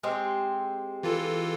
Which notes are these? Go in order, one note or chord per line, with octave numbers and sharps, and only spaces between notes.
G#3 C4 G4
E3 F4 A4